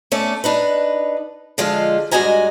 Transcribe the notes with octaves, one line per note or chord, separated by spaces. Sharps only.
A3 C#4 A4 D5
D4 D#4 B4
D3 F3 G#3 F4 A4 F5
G2 G#3 F#4 D#5 G#5 A#5